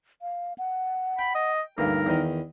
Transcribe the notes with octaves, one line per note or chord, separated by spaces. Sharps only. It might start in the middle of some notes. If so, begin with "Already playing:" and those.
F5
F#5
G5 B5
D#5
D2 G2 A#2 D#4 A#4
E2 D#3